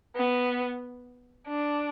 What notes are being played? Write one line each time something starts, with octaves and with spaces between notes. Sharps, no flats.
B3
D4